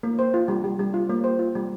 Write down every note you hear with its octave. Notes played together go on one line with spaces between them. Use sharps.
A#3
C5
F4
G3
G3
G3
F4
A#3
C5
F4
G3